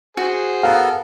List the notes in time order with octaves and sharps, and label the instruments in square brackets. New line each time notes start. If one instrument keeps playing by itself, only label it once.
[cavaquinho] F#4 [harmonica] G#4 C5
[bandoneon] B3 A4 A#4 [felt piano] F5 F#5